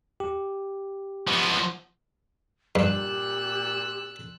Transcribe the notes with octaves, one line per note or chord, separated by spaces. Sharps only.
G4
F3 B3
G2 A#2 G4 E6 F#6